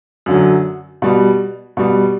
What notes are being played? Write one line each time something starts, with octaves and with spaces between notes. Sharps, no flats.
F#2 D3 F#3
B2 G3
B2 G3